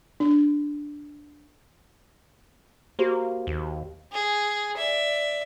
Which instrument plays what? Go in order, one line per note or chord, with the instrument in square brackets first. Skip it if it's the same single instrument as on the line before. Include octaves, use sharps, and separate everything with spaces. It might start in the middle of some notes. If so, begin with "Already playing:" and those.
[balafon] D4
[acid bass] A#3 [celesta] F#4 G4 C5
[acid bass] D#2
[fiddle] G#4
D5 E5